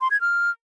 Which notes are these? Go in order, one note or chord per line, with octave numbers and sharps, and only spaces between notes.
C6
G#6
F6